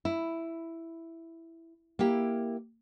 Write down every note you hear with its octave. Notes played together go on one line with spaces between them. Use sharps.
E4
A#3 E4 G4